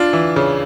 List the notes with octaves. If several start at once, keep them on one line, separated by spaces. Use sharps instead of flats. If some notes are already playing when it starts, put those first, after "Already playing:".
Already playing: D4 F4
E3
C#3